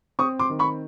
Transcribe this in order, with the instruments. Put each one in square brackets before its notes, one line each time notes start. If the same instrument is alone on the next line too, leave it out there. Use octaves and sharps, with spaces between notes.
[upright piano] C4 C#6 D#6
C6 D6
D#3
B5 C#6